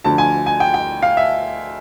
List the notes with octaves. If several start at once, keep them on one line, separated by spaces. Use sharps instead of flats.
D2 D3 F3 A5
G#5
G#5
G5
G5
F5
E5